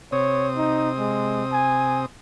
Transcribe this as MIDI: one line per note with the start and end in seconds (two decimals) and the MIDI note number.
0.12 2.06 48
0.12 2.06 60
0.12 0.49 73
0.12 2.06 87
0.57 0.90 63
0.98 1.43 56
1.53 2.02 80